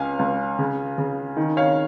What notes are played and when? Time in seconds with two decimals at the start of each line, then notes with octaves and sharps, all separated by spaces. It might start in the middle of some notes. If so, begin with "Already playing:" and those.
Already playing: C#2 C#4 F5 G#5
0.19 C#2
0.59 C#3
0.98 C#3
1.37 D#3
1.57 C#5 F5